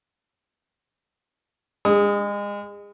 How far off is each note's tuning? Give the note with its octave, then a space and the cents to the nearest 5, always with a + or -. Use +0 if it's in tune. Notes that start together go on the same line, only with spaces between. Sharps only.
G#3 -30 D#6 +5